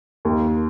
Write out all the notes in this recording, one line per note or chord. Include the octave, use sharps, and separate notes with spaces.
D#2